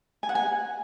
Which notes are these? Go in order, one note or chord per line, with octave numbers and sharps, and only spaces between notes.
G#5
F#5
G#5